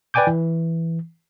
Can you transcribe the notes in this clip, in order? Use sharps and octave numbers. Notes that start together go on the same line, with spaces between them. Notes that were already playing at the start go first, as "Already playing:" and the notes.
B4 D5 G5 G#5 D6 G6
E3